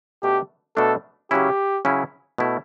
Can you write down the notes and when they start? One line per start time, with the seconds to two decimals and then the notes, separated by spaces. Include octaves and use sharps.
0.23 B2 A3 D4 G4
0.77 B2 A3 D4 A4
1.31 C#3 F#3 C#4 E4 G4
1.85 C#3 F#3 C#4 E4
2.38 B2 A3 E4